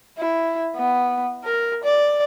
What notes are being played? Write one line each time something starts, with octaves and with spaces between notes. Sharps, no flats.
E4
B3
A#4
D5